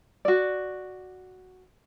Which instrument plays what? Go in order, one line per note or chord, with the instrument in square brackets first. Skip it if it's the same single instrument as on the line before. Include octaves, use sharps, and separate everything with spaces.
[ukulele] F#4 D5